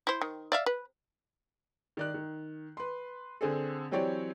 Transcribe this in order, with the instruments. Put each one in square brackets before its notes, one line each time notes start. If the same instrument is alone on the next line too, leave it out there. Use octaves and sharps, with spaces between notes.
[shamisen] E4 C5
D#3
D5 E5 F5
B4
[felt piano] D#3 D5 F#6
D#3
B4 C6
D3 C4 G#4 A4
E3 F#3 C4 G4 C#5 D5